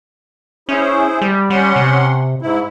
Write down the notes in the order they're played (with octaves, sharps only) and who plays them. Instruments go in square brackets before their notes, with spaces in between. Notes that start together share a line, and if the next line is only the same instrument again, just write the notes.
[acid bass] C#4 [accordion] E4 G#4 C5
[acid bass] G3
[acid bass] G3 [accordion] C#4 F#5 C6
[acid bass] C3
[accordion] G#2 E4